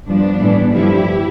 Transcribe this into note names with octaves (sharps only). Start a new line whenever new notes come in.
G2 F3 B3 D4
A2 E3 G3
G2 D3 F3 E4 G4